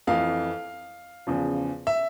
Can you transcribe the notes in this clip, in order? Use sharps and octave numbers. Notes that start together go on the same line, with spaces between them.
F2 E3 F5
E2 C#3 F3
E5